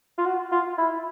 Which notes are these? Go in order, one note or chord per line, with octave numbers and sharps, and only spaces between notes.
F4
F#4
F4
E4